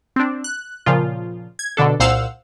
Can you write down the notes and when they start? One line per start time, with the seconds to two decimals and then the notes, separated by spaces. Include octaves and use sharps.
0.16 C4 D4
0.44 F#6
0.86 A#2 C#3 F3 F4
1.59 G#6
1.77 B2 D3 D4 A4
2.00 C2 A#2 C5 F5 F#5 E6